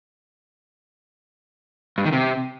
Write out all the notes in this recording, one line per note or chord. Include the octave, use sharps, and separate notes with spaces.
G2
D#3
C3